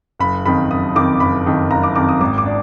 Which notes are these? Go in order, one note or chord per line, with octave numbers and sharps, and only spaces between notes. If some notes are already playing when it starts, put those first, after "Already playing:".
F#1 B5
F2 D#3 B5
F#1 D#6
F2 D#3 D6
F#1 B5
F2 D#3
F#1 A#5
D6
F2 D#3 D6
D#6
G#1 D6
D6
D4